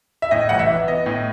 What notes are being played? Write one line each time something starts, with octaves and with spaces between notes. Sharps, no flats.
E5
A2 D#5
A1 F#5
E5
E3
B3 D#5
A2